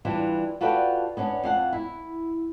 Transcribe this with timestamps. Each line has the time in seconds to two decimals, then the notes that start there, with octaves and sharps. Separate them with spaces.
0.05 E3 G3 D4 F4
0.61 F4 F#4 A4 B4 D5 G5
1.17 B3 C#4 D4
1.43 F2 F5 F#5
1.73 E4